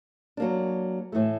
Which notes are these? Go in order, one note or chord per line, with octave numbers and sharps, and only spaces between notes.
F#3 A#3 D4
A2 E3 A3